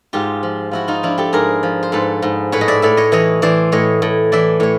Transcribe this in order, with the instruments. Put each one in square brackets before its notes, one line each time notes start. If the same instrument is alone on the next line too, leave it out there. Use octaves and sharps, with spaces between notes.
[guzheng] G#2 F4 G4
F3
F3 E4 F#4
D#4 F4
F3 D4 E4
G4 A4
G#2 G#4 A#4
F3
C5
G#2 A4 B4
G#2
A2 B4 C#5
D#5
D5 E5
A2 D5 E5
C#5 D#5
E3 C#5 D#5
E3 C5 D5
A2 C#5 D#5
A2
E3 D5 E5
A2 C#5